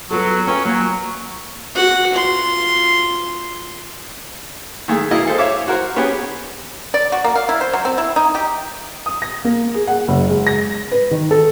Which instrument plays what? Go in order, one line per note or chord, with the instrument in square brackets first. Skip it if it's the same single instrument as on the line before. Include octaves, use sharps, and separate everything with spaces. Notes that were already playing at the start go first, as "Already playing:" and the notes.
[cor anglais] F#3 [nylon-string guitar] B3 F4 A4
[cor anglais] C#4 [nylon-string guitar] F4 B4 G5
[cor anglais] F#3 [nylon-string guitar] A#3
[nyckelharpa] F#4 F#5
F4 C6
[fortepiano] D#3 G#3 A3 G#4
B2 A#3 E4 D#5 F5
G#4 A4 C5
C#5 E5 F5 D6
F#4 A#4 C5
B3 C#4 G4 G#4 B4 C#5
[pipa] D5
F#4
A#3
F5
E4
C5
F#3
C4
E4
D#4
G4
[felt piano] D#6
A#6
A#3
G#4
F#5
F#1
G#3
A#6
B4
D#3
A4